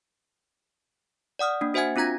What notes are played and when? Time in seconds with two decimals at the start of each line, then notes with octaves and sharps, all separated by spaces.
1.39 D5 F#5 D#6 F6
1.61 A#3 D4
1.74 F#4 C5 E5 F#5 G#5 G#6
1.96 C4 D4 F4 A#5 G#6 A#6